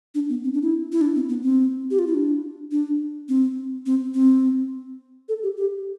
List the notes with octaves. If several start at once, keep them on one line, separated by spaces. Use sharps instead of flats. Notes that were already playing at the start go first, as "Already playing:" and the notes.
D4
B3
C4
D4
E4
E4
D4
C4
B3
C4
G4
F4
E4
D4
D4
C4
C4
C4
A4
G4
G4